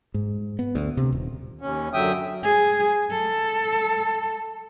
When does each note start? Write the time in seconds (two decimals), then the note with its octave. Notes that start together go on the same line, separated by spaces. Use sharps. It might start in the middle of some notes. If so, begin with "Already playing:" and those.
0.14 G#2
0.59 B3
0.75 D2
0.97 C3
1.12 D#1
1.61 D#2 C#4
1.93 F#2 D3 F#3 E5 G5 D#6
2.44 G#4
3.11 A4